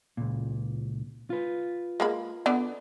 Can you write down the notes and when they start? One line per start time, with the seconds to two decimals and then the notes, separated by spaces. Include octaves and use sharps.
0.17 C#2 A#2
1.30 F4 B4
2.00 G#3 A#3 B5
2.46 D3 B3 D5